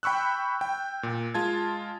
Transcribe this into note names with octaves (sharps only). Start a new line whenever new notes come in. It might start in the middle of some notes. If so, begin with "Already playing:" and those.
G5 B5 C#6 E6 F#6
G5
A#2
G#3 F4 A5 G#6